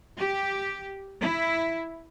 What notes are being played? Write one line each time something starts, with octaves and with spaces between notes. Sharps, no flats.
G4
E4